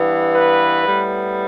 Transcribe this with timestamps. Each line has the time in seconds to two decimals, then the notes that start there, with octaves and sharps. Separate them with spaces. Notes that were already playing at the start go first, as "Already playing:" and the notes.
Already playing: G2 E3 B3
0.33 B4
0.83 A2 G3 B3